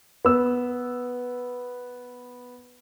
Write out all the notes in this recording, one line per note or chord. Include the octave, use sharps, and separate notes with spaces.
B3 E6